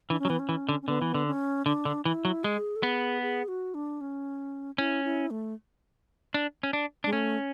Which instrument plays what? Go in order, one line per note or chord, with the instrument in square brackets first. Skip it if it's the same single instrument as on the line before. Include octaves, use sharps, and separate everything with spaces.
[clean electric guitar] E3 [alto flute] D4
[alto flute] C#4
[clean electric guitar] F#3
[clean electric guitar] E3 [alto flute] B3
[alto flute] C#4
[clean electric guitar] E3
D3
[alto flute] C#4
[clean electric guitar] D3 [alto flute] B3
[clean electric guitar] E3
D3
[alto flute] C#4
[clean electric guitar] D3 [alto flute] D4
[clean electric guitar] D3
[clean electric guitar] E3 [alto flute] E4
[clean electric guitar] F#3
[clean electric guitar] G#3 [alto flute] G#4
[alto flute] A4
[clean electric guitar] B3 [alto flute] G#4
[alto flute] G#4
F#4
D4
C#4
[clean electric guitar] C#4 [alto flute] E4
[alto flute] E4
A3
[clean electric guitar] D4
C#4
D4
[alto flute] G#3 [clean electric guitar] D4
[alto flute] A3 [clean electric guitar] C#4